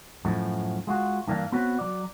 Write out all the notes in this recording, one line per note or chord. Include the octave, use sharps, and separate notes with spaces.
F#2 A2 F3
G#3 F4 F#4
G2 E3 A#3 D4 F4 F5
B3 C4 F#4 B4 C#5
F#3 D5